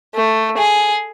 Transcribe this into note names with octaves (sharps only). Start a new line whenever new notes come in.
A3
G#4